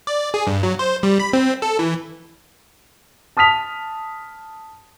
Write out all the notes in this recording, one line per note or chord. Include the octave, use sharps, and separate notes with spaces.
D5
G#4
G2
F#3
C5
G3
B5
C4
A4
E3
A5 D#6 F6 B6 F7